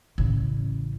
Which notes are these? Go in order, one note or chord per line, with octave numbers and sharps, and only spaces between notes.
A1 C#3